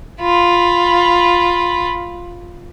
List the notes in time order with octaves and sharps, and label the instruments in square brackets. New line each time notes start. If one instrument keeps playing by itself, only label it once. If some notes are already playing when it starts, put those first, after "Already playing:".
[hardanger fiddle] F4 B5